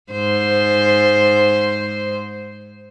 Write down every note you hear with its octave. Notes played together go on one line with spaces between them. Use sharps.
G#2 C5